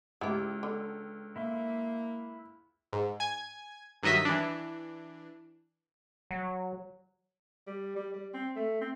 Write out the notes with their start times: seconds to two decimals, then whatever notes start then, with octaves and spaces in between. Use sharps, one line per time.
0.21 C#2 E4 G4
0.63 D3
1.36 A#3 E4 E5 C6
2.93 G#2
3.20 G#5 G#6
4.03 G2 D#3 F#3 D#5 E5 B6
4.25 E3 D4
6.31 F#3
7.67 G3
7.96 G3
8.14 G3
8.34 C4
8.56 A3
8.81 C4